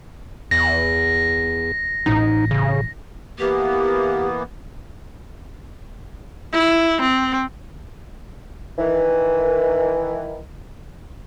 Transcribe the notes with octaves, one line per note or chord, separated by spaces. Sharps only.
E2 A#6
A1 D#4
C#3
E3 A#3 B3 G4
E4
C4
D#3 E3